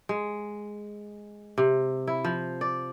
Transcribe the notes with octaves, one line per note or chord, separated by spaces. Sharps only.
G#3
C3
E4
F3
D5